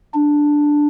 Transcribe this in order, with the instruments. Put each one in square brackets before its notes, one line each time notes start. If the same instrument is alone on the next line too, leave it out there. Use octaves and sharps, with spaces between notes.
[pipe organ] D4